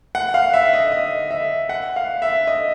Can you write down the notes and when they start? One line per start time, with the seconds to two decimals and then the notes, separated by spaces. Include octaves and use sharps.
0.15 F#5
0.34 F5
0.54 E5
0.73 D#5
0.92 D#5
1.31 E5
1.69 F#5
1.96 F5
2.22 E5
2.47 D#5